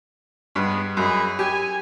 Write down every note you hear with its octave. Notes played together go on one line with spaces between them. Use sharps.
G2 G#3 B3
F#2 G#3 G#4 B5
G4 G#5